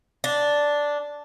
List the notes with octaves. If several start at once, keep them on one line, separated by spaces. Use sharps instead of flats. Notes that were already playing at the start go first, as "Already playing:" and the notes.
D4